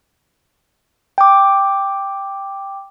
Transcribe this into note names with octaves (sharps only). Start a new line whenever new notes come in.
G5 D6